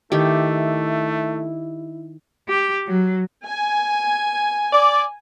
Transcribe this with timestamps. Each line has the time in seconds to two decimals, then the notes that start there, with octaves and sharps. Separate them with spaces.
0.12 D#3 A3 E4 G4
2.48 G4
2.87 F#3
3.44 G#5
4.73 D5